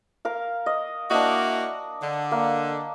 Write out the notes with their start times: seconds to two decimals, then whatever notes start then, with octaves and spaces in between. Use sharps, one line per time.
0.25 A#4 F5
0.66 D#5
1.11 A#3 D4 E4 F#4 D#5
2.01 D3
2.31 A#3